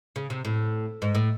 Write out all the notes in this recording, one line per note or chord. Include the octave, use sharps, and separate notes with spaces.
C#3
C3
A2
G#2
A2